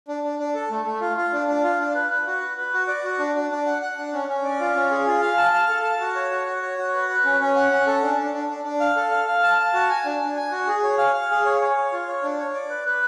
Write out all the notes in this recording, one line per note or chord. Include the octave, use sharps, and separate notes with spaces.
D4
D4
D4
A4
A3
A3
F4
F4
D4
D4
F4
D4
B4
B4
F#4
B4
B4
F#4
D5
F#4
D4
D4
D4
F#5
F#5
D4
C#4
C#4
D5
F4
C#4
G#4
F4
F5
A5
F5
A4
A5
F#4
C#5
F#4
F#4
C#5
F#4
B4
B4
C#4
C#4
F#5
C#4
A4
D4
D4
D4
D4
D4
F5
A4
F5
F5
A5
A5
F#4
G#5
D4
D4
G#5
F#4
G#4
C#5
F5
F5
G#4
C#5
C#5
C#5
F4
C#5
D4
C#5
D5
B4
B4